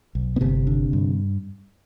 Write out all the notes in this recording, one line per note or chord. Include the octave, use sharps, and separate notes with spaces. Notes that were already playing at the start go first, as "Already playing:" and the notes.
B1
B3
G1 C3 C4
D3
G2